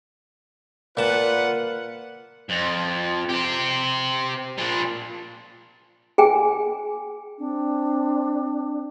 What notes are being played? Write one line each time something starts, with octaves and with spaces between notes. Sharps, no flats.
A#2 F4 B4 F#5 A5
F2
C4 G4
A#2 D4
G#4 G5 G#5
C4 D4